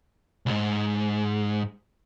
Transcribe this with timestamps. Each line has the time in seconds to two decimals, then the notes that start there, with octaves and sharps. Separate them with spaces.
0.46 C2 G#2